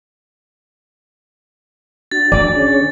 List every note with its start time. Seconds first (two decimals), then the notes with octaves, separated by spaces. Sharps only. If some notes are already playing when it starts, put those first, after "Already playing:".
2.11 D4 F#4 A6
2.32 D3 D5
2.55 C#4 G#4 C#5